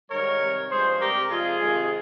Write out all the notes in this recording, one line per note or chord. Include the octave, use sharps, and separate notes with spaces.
G#2 D#3 G3 A#4 C#5
C3 G3
G2 F3 G#3 G#4 C5
C3 G3 G4 A#4
C3 F3 G#3 F4 G#4
C3 D#3 G#3